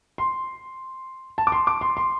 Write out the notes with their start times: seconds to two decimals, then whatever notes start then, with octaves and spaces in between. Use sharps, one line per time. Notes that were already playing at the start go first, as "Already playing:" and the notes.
0.18 C6
1.38 A5
1.47 D6
1.52 C6
1.67 D6
1.81 C6
1.97 C6